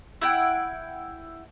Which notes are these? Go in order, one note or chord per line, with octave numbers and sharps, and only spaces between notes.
E4 F#5 G5